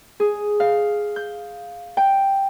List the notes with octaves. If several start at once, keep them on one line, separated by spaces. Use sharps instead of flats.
G#4
F5
G6
G5